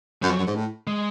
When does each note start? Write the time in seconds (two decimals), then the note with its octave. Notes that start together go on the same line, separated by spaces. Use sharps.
0.22 F#2 F#3
0.31 F2
0.39 F#2
0.47 G#2
0.55 A2
0.87 G#3